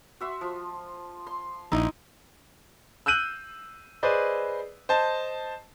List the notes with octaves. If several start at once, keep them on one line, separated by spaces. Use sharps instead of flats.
F#4 E5 C6
F3
C6
A#1 D#4 E4
E6 F#6 G6 D#7 F#7
G#4 B4 C5 D5 D#5
C5 D#5 A5